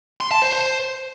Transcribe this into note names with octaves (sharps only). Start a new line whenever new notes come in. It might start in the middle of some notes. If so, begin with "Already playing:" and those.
C6
A5
C5
C5